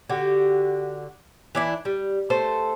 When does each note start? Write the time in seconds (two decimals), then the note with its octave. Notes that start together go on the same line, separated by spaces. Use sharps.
0.09 D3 F#4 G4
1.55 E3 D4 E4
1.85 G3
2.30 A3 A4 C5